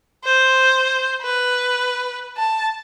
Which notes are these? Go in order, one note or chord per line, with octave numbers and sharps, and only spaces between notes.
C5
B4
A5